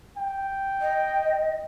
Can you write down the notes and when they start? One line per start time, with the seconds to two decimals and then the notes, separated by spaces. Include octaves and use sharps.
0.17 G5
0.81 D#5